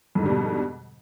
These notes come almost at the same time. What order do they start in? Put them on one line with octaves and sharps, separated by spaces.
F2 G#2 D3 G3 B2